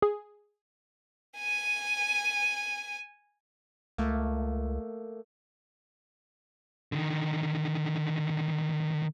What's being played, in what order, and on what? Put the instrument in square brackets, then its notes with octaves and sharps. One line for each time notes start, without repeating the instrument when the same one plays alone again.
[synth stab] G#4
[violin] G#5 D#7
[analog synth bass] C#2 [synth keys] A3 A#3
[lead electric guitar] D3 D#3